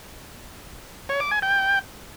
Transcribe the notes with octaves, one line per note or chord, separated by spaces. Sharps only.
C#5
D6
G#5
G5